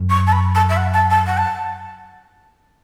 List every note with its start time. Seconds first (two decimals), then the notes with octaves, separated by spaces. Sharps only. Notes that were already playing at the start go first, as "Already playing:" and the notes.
Already playing: F#2
0.10 C#6
0.27 A5
0.32 B5
0.55 A5
0.69 E5
0.77 F#5
0.94 A5
1.10 A5
1.27 F#5
1.37 A5